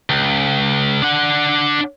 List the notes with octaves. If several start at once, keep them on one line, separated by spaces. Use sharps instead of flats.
C#2
D4 F#5